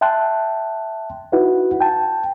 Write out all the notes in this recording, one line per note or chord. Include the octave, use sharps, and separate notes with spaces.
E5 G5 A5 C6 F#6
D#4 E4 F#4 B4 F#5
G5 A5